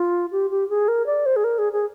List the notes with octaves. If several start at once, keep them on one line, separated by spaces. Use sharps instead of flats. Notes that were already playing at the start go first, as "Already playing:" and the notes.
Already playing: F4
G4
G4
G#4
A#4
D5
C5
G#4
A#4
G#4
G#4